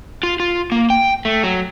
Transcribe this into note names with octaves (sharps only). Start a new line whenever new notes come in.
F4
F4
A#3
G5
A3
F#3